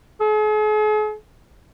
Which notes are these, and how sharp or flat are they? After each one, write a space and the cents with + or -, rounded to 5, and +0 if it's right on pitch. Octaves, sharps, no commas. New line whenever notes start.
G#4 +45